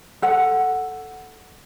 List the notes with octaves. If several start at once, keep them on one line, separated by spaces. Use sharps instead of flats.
A4 F#5